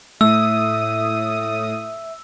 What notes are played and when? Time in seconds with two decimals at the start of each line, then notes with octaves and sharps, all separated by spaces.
0.21 A2 A3 E5 D#6 E6